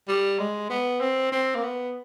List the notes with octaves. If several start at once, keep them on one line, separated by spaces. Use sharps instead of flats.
G3
G#3
B3
C4
C4
A#3
B3